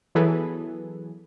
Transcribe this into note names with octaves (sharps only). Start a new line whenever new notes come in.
E3 F#3 B3 G#4 A4 B4